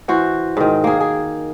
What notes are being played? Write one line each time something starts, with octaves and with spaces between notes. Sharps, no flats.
E3 F#4 C5
G#2 D#3
A#3 G#4
G#4